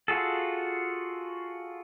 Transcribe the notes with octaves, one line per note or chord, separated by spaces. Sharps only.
F4 F#4 G#4 A4